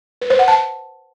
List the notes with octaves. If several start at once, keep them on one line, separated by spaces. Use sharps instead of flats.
B4
C5
F#5
A5